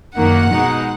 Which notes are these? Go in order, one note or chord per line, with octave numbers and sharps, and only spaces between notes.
F#2 D#3 A#3 F#5
B2 G#3 D#4